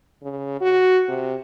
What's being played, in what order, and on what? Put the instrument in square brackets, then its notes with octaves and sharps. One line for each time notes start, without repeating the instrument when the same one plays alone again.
[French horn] C#3
F#4
C3